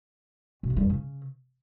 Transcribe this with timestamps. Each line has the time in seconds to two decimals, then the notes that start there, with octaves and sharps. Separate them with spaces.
0.63 B2
0.70 G2
0.76 G3
0.83 F2
0.90 C#3